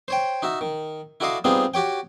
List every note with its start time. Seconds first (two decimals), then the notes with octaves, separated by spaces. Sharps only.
0.08 C5 C#5 G5
0.42 D#4 F#4 E5
0.61 D#3
1.20 E4 F#4 A4 D5 D#5 F5
1.44 G3 B3 C4 D#4 F4 G#4
1.74 F#4 G4 C#5 G5